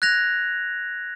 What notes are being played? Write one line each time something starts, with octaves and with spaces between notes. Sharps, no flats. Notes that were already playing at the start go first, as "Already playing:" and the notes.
F#6 G#6 A#6 F7